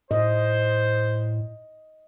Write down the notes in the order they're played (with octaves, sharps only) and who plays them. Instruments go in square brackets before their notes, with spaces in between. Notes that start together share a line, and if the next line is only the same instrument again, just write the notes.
[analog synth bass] A2 [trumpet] C5 [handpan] D#5